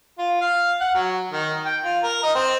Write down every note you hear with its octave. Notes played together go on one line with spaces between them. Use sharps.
F4
F5
F#5
F#3
D#3
G5
F4
A#4
D#5
C4